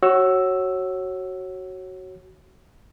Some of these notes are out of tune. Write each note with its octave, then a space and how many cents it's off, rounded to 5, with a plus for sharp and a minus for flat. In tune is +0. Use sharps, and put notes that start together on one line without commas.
F#4 +15 C#5 -20 E6 +0